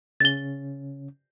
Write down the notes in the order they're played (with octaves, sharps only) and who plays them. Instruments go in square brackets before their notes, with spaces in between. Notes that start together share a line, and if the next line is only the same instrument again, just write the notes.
[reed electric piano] C#3 C#4 [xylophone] A6 G7